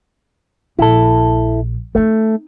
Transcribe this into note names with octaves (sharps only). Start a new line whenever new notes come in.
A#1 E4 A4
A3 C4 D#4